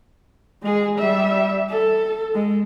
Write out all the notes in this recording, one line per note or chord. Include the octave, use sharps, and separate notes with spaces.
G#3 G#4
G3 E5
A4
G#3